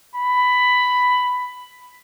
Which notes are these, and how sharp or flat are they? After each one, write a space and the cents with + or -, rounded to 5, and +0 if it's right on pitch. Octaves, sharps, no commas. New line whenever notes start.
B5 +10